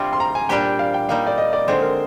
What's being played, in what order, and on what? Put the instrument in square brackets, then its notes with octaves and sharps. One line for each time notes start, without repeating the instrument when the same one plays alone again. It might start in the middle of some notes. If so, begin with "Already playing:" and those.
Already playing: [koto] C3 G3 C4 D4 F4 [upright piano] D6
[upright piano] C6
A#5
G#5
[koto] A#2 G3 D4 G4 [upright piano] G5
[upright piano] F5
G5
[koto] G3 A#3 D#4 [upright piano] F5
[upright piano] D5
D#5
D5
[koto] D3 G#3 C4 [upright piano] C5
[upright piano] A#4